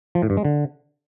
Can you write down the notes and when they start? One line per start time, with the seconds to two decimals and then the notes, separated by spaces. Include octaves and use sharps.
0.15 F3
0.22 A2
0.30 G2
0.37 G#3
0.45 D3